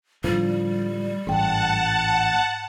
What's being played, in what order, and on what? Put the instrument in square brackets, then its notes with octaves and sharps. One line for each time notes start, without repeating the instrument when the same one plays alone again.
[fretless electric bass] A2 D3 F3 [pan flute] G3
[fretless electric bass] A1 [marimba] G#2 G5 [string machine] F#5 A5